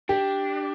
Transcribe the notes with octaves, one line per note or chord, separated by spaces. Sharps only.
D4 G4